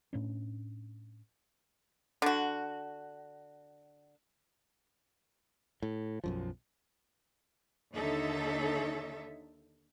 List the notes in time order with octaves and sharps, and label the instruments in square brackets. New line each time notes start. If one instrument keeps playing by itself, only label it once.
[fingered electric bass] A2 C#4 D4
[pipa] D3 F#4
[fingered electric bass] A2
B1 F#2 F3
[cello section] D#2 D3 D#4 A4 C#5 E5